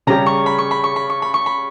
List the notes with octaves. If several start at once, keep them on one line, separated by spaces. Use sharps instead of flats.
C#3 G3 C#4 G4 C#5 A#5
C#6
B5
C#6
B5
C#6
B5
C#6
B5
C#6
B5